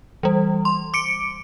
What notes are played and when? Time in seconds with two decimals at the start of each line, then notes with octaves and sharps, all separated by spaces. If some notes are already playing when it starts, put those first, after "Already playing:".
0.23 E3 G3
0.65 C6
0.94 D6 C#7 D7